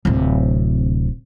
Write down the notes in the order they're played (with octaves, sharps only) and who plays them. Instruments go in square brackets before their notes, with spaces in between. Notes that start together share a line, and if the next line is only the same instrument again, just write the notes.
[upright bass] D1 C3